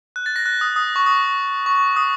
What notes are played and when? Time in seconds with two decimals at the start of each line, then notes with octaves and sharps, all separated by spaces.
0.16 F#6
0.26 A6
0.36 A#6
0.46 F#6
0.61 D#6
0.76 D#6
0.96 C#6
1.06 D#6
1.66 C#6
1.96 D#6